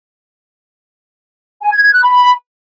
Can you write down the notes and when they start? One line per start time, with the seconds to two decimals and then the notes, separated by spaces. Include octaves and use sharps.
1.62 G#5
1.73 G#6
1.83 G#6
1.93 F#6
2.03 B5